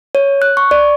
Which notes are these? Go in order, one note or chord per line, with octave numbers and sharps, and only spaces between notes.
C#5
F#6
C#6
D5